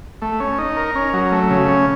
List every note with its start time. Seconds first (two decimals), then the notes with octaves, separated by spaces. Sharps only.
0.22 A3
0.40 C#4
0.58 D#4
0.77 A#4
0.96 C#4
1.13 F#3
1.32 A3
1.50 C#3
1.68 C#4